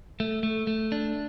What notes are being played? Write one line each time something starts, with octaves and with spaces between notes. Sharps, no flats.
A3
A3
A3
D4